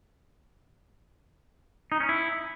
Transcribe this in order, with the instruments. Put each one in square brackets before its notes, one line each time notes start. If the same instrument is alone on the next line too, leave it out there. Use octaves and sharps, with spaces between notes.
[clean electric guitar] D#4
C#4
E4